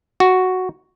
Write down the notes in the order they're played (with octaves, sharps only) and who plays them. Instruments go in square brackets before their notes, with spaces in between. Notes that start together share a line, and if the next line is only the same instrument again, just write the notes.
[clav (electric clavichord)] F#4